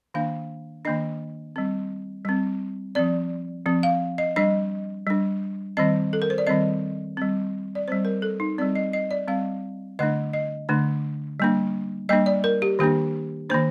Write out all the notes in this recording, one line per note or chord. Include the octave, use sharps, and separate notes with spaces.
D#3 A#3 D4 F5
D#3 A#3 D4 D#5
G3 C4
G3 C4
F3 C4 D5
F3 C4
F5
D#5
G3 D4 D#5
G3 D4
D#3 G3 C4 D#5
A4
A#4
C5
D5
D#3 G3 C4 D#5
G3 C4
D5
G3 C4 C5
A#4
A4
D#4
G3 C4 D5
D#5
D#5
D5
G3 C4 F5
D3 A3 D4 D#5
D#5
D3 A3 D4
G3 A#3 D4
G3 A#3 D4 D#5
D5
A#4
G4
D#3 A#3 D4 G4
D#3 A#3 D4 C5